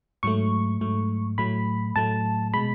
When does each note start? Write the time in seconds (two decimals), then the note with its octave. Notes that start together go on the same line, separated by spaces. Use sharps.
0.23 G#2 F#3 A3 C#6
0.81 G#2 F#3 A3
1.38 A2 F#3 A3 B5
1.96 A2 F#3 A3 A5
2.54 B2 G#3 B5